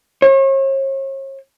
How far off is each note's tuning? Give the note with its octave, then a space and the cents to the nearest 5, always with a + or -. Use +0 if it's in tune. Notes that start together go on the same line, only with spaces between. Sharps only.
C#5 -40